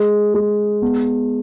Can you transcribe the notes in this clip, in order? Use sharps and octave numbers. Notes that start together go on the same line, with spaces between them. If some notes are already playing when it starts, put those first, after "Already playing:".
Already playing: G#3
G#3
B3